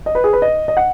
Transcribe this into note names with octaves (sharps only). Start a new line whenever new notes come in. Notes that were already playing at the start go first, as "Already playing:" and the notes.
D#5
B4
G#4
B4
D#5
D#5
F#5